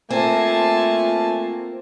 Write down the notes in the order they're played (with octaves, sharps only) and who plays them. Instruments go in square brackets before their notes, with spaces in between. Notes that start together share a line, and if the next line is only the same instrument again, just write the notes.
[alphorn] A3 [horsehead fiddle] A#3 F4 [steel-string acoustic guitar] C4 [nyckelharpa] G#5 A5